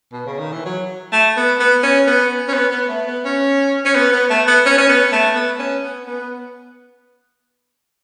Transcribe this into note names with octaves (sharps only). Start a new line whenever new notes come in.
B2
C#3
D#3
E3
F#3
A3
B3
B3
C#4
B3
C#4
B3
B3
A3
B3
C#4
C#4
B3
B3
A3
B3
C#4
C#4
B3
A3
B3
C#4
B3
B3